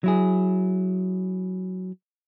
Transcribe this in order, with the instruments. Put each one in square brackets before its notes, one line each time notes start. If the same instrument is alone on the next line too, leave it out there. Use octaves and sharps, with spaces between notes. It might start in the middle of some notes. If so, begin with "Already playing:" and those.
[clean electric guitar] F#3 E4 G#4